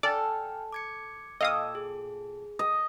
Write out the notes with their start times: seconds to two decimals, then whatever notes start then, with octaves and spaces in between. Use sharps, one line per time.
0.03 A4 D5 G5 G#5 F6
0.73 D6 G#6 C#7
1.41 A#2 A4 D#5 F5 G5 D#6 E6 G#6
1.75 G#4
2.59 D#5